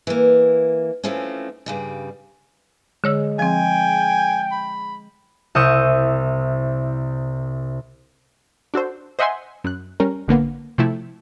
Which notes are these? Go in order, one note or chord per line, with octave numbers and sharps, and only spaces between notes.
E3 A#3
E3 F3 A3 C4 C#4
G2 C#3 G3
D3 G#3 C#5 E6
F3 C4 G5 G#5
B5
C2 E5 C#6 D#6 G6
D4 F#4 A4 C5
C5 D#5 E5 F#5 G#5 C6
F#2 F#6
G3 C#4 A#4
A1 D3 A#3 B3
C3 F3 A3 E4